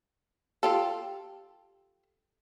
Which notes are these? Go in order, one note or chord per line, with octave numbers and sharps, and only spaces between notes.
F4 G4 A4